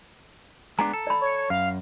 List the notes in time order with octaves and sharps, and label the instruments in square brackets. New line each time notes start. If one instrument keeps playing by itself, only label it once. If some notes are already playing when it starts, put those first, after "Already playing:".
[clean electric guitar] G#3 B3 D4 [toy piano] A#5
[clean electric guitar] A4
[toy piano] D5 B5
[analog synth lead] C#5
[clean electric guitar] F#2 [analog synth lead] F5